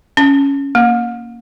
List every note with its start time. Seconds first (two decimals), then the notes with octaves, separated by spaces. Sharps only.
0.17 C#4
0.75 A#3